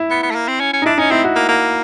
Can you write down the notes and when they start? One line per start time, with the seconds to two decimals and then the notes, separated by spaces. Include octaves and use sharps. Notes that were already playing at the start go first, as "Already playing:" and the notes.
Already playing: E4
0.10 B3
0.23 B3
0.31 A3
0.35 A#3
0.48 C4
0.60 C#4
0.73 C#4
0.82 D#4
0.86 D4 E4
0.98 C#4 D#4
1.11 C4 E4
1.24 F#4
1.36 A#3
1.49 A#3